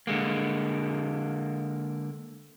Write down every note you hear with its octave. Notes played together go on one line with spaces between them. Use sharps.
D3 G#3 A#3